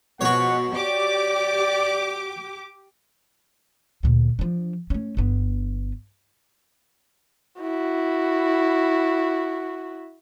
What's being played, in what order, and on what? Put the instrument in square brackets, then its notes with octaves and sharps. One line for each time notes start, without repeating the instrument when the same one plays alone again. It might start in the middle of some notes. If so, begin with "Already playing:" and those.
[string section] B2 [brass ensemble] F3 G#3 F#5 [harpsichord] F#4 C#5
[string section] G4 D6 [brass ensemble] D5
[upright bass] D2 A#2
F3 D4
A3 C#4
G1 B3
[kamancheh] E4 F#4